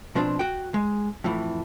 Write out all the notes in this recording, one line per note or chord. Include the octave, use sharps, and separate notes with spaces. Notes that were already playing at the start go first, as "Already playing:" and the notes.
B2 F3 C4 D4
F#4 G5
G#3
F2 A2 E3